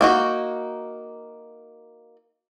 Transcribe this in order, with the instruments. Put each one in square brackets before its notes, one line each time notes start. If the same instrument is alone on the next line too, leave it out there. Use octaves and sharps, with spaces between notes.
[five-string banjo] A#3 D#4 F#4